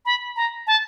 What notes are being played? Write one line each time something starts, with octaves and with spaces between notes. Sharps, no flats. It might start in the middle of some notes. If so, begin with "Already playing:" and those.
B5
A#5
A5